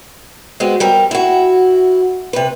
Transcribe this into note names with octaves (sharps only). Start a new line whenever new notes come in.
G#3 B3 C4 F#4
G3 C4 G4 A#4
E4 F#4
C3 B4